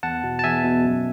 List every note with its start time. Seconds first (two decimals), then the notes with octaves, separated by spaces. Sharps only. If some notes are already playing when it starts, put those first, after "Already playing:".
0.03 E2 F#5 A5
0.23 B2
0.39 A5
0.44 E2 E5 G#5
0.64 B2
0.84 F#2